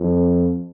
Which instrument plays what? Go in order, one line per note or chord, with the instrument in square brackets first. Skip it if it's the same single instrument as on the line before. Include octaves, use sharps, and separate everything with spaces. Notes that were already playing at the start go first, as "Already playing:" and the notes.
Already playing: [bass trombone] F2